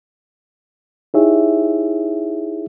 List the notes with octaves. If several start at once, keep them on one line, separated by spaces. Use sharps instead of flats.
D#4 E4 G4 G#4 C#5 E5